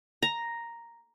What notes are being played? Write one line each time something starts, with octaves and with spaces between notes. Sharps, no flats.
A#5